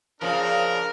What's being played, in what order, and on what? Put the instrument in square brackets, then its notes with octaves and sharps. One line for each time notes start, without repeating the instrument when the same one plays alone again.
[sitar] A#2 C#3 F3 [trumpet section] D4 A#4